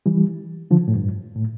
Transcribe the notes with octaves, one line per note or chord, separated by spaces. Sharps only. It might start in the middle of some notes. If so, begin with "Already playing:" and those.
E3 G3
D3 F3
A2
G2
A2